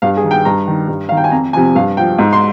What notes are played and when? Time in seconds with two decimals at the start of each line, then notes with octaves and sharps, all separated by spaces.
0.02 G2 F5
0.17 G#4
0.24 D#3
0.31 G5
0.45 G2 A#5
0.68 D#3
0.88 G2
1.09 D#3 F5
1.17 G5
1.24 G#5
1.32 F2 A#5
1.53 C3 F3 G#5
1.75 G2 F5
1.97 F3 G5
2.18 G#2
2.33 C6